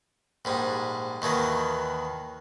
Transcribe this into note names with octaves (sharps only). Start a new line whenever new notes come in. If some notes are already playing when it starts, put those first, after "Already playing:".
A#1 G#2 G3
D#2 D#3 E3 F#3